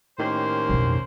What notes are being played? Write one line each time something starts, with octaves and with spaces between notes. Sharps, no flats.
A2 D#3 A#3 C#4 G4 C5
B1 F2